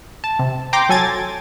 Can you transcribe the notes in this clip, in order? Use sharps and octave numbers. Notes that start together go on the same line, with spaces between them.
A5
C3
G5 A#5 C6 D6
F#3 A4 G#5 G#6 A6